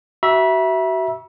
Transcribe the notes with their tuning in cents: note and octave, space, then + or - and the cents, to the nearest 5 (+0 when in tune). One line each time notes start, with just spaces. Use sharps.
F#4 +30 E5 +0 B5 -45